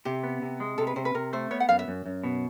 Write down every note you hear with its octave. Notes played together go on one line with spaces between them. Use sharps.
C3 G4
B3
C3
G#3
C3 A4
B4
C3 C5
B4
C3 A#4
A3 C5
B3 C#5
F#5
F#2 F5
E5
F#2
F#2
B2